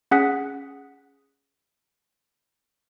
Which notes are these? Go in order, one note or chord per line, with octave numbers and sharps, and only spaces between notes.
C#4 G#4 F#5 D#6 F#6 B6